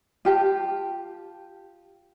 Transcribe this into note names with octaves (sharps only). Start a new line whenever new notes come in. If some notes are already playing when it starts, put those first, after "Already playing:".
F4 G4 A5